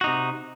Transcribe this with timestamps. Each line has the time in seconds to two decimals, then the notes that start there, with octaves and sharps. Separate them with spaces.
0.01 F#4
0.04 D#4
0.07 C3